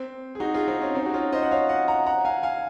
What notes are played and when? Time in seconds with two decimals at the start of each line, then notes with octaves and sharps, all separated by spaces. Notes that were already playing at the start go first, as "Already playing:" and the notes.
Already playing: C4
0.35 G#4
0.40 D#4 F#4
0.54 F4 G#4
0.68 C4 D#4
0.82 C#4 F4
0.95 C4 D#4
1.06 F#4
1.14 C#4 F4
1.33 C5 D#5
1.43 F#5
1.51 C#5 F5
1.69 D#5 F#5
1.88 F#5 A#5
2.06 F#5 A#5
2.25 F5 G#5
2.43 F5 G#5